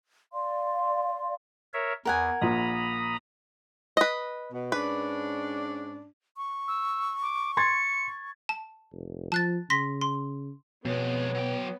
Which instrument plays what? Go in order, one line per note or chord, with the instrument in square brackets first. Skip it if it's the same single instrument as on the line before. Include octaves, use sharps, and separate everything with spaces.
[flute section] D5 F5 C6
[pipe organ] A#4 C#5 E5
[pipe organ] E2 [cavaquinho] A#4 F#5 G#5
[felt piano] A#1 A#2 [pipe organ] A#5 B5 D#6
[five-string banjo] B4 D#5
[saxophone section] B2
[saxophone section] G#2 C#4 D4 [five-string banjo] B4
[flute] C#6
[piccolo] E6
D6
[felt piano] C6 G#6 A6 [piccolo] C#7
[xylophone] A5
[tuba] F1
[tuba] F3 [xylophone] A5 F#6 A6
[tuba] C#3 [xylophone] C6 A#6 B6
[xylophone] C6
[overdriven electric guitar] F2 G#3 [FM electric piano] B2 [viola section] B3 [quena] C#5
[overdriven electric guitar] F#3 G5